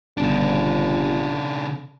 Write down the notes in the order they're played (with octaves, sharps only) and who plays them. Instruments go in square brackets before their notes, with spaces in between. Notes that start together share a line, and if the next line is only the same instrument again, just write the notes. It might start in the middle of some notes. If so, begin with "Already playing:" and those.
[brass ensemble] G1 [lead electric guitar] C#3 D4